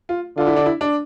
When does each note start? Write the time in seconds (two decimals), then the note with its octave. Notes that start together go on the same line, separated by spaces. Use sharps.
0.09 F4
0.37 D3 F4
0.47 E4
0.56 D4
0.66 E4
0.81 D4